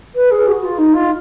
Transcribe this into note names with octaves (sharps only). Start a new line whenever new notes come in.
B4
G#4
F#4
F4
D#4
F4